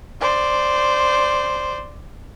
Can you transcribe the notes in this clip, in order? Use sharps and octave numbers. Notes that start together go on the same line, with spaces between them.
C5 D5